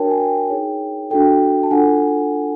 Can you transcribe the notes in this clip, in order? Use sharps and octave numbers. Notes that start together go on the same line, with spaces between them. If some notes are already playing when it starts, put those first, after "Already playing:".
Already playing: D4 F#4 A#4 C#5 G5 A5
G#5
G5
D#4 G#4 C#5
D4 F#4 A4 G5
A5
D4 F4 A4 F#5 G#5